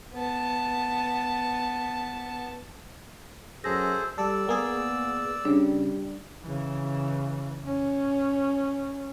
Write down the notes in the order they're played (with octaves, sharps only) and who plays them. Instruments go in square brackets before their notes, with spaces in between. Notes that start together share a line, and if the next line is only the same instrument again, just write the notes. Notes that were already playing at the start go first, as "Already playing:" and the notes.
[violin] B3 A5
[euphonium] F#2 [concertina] G#4 A4 C5 [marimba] A#6
[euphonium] G3 [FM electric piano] A4 [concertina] D5 E6
[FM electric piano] A#3 G#4 [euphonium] B3
[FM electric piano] C#3 [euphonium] G3 [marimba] D4
[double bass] C#3 E3
C#4